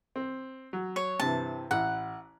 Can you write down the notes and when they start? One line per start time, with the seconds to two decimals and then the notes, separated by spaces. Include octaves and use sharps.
0.16 C4
0.73 F#3
0.96 C#5
1.20 G2 C3 E3 A5
1.71 A1 E4 F#5